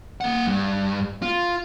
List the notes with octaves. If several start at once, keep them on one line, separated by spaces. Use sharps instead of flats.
A#3 F#5
G2
F4